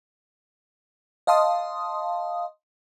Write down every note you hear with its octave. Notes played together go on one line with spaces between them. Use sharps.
D#5 F5 A5 C6 D#6